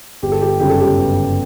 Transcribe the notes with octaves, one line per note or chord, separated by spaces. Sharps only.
G1 G4
A4
G4
F#2 C#3 G3 C#4 G4
A4
G4
G1